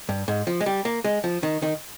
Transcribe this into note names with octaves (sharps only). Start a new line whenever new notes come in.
G2
G#2
F3
G#3
G3
A#3
G#3
F3
D#3
D#3